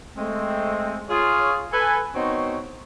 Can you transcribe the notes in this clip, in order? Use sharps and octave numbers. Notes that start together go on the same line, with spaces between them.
G#3 A3 C4
F4 G#4 C#5
A4 B4 G#5
B3 C4 D#4 F#4 C5 C#5